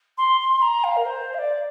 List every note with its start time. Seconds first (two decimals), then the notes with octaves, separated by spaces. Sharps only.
0.17 C6
0.40 C6
0.61 A#5
0.83 F5
0.96 A#4
1.05 C5
1.34 F5
1.38 D5